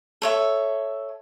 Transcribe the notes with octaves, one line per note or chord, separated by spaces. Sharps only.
A4 C#5 E5